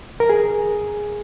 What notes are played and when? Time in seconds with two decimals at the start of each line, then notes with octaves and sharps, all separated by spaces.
0.20 A#4
0.30 G#4